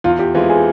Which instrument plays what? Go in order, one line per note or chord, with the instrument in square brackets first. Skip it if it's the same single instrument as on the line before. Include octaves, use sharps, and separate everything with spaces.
[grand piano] E2 [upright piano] F4
[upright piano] G4
[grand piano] E3 G#3 C4 [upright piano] F4
[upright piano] G#4